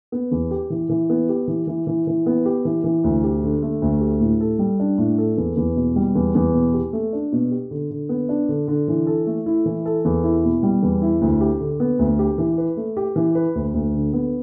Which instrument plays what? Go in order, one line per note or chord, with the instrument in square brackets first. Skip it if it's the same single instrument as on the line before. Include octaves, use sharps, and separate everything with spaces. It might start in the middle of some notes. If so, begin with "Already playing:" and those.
[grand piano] B3
E2
G4
E3
E3
B3
G4
E3
E3
E3
E3
B3
G4
E3
E3
D2
G4
D3
A3
D2
G4
A2
A4
G3
D4
A2
A4
E2
E2
B2
G3
E2
E2
B2
G4
A3
D4
B2
G4
D3
D3
B3
D4
D3
D3
E3
A4
A3
E4
E3
A4
E2
E4
B2
G3
E2
E4
D2
G4
D3
B3
D2
G4
E3
B4
A3
G4
E3
B4
D2
D2
D3
B3